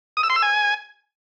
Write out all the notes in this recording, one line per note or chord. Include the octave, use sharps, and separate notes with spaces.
D#6
E6
C6
E6
G#5